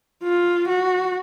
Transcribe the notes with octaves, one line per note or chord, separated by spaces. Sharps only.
F4
F#4